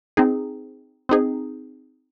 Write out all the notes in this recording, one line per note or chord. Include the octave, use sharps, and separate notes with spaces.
C4 D#4 G#4
C4 D#4 G#4